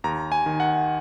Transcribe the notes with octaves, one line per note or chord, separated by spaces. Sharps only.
D#2 A#5
G#5
D#3
F#5